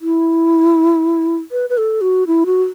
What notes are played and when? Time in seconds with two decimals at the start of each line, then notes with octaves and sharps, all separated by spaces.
0.01 E4
1.52 B4
1.70 B4
1.77 A4
2.01 F#4
2.27 E4
2.46 F#4